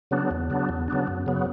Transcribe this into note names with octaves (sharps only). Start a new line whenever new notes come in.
C#3 F#3 B3 D4
E2
C#3 F#3 B3 D4
E2
C#3 F#3 B3 D4
F#2
C#3 F#3 B3